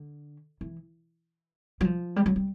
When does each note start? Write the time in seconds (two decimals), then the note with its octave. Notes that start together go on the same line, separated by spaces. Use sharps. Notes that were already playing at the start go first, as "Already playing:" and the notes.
Already playing: D3
0.61 E3
1.81 F#3
1.85 F3
2.16 G3
2.26 F#3
2.36 G3